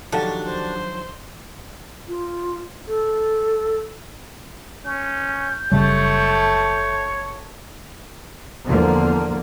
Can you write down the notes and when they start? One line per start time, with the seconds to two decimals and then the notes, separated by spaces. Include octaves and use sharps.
0.12 D#3 F3 F#3 D4 F#4 G4 A4
0.46 C5
2.08 F4
2.88 A4
4.85 C#4 G6
5.72 F#1 C#3 G3 A3 C#5 A5
8.67 E2 D3 F3 A#3